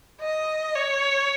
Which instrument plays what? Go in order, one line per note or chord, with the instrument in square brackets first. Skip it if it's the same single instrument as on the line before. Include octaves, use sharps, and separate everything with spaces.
[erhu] D#5
C#5